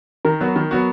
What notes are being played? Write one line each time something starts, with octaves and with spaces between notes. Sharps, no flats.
D#3 A#4
F#3 B3 F#4
D#3
F#3 B3 F#4